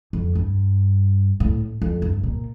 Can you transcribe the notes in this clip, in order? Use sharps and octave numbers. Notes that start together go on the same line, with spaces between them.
F2
G2
A2
F2
G2
A#2